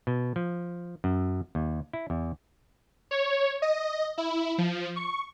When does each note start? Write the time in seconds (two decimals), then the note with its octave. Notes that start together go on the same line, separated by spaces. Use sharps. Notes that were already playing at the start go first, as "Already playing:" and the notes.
0.07 B2
0.36 F3
1.04 F#2
1.55 D#2
1.93 E4
2.10 E2
3.11 C#5
3.62 D#5
4.18 E4
4.58 F3
4.96 C#6